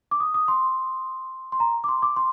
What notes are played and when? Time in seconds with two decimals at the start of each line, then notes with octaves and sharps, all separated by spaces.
0.11 D6
0.20 D#6
0.34 D#6
0.48 C6
1.52 C6
1.60 A#5
1.84 D6
1.89 C6
2.03 D6
2.16 C6